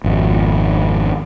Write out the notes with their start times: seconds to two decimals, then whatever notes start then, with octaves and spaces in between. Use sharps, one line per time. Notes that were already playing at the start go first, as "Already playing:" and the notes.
0.04 G#1 F2